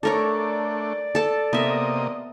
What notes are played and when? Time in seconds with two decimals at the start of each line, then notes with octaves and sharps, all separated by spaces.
0.03 A3 D4 A4 A#4 C#5 D5
1.15 A4 A5
1.53 C3 A#3 B3 D#5 E5